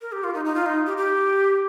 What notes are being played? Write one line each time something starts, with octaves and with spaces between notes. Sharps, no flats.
A#4
G4
F4
D#4
D#4
F4
D#4
G4
G4